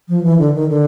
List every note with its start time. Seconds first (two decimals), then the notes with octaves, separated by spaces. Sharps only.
0.09 F3
0.23 E3
0.39 D3
0.54 D#3
0.69 D3